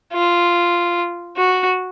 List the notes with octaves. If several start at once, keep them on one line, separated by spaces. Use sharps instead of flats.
F4
F#4